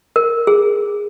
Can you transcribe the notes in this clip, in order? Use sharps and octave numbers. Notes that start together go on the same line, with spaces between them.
A#4
G#4